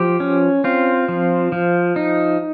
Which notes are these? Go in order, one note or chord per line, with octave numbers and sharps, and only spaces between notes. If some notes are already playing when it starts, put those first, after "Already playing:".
Already playing: F3 G4
C#4
C4 F4
F3
F3
D#4